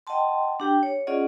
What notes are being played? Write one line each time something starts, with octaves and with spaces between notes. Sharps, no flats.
D#5 F#5 G5 A5 C6
D4 G4 G5
C#5
C#4 F4 G#4 D5 D#5 F#5